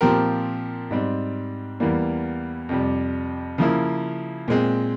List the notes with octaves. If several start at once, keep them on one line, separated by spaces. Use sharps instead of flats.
A#2 F3 C4 G4 A#4
G#2 G3 C4
E2 E3 G3 A#3
F2 C3 G3
C#3 F3 A#3 E4
A#2 G#3 C4